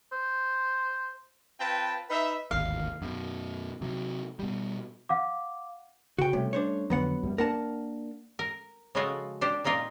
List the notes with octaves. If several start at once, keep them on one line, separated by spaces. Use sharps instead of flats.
C5
C4 F4 B4 G5 A5
D#4 B4 E5
D1 G#1 D#2 F5
F#2 B2
C3 F#3
B2 G3
F5 F#5 D6
C#3 F#4 G5
C3 G3 A3 C#4
D4 C5 C#5
F2 D3 F#3 B3 F#5
F#2 G3
A#3 D4 A#4 F#5 A5
A#4
C#3 F3 G#3 F4 F#4 A4
D4 G4 C5
A#2 A#3 D#4 F4 A#4